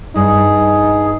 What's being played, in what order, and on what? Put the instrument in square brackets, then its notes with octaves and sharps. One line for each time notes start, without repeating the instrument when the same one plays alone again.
[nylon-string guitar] G2 [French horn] D#4 [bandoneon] G#4